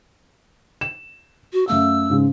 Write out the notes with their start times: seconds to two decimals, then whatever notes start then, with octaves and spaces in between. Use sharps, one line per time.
0.81 E7
1.53 F#4
1.68 F#2 A3 F5 E6
2.10 G#2 C#3 G#3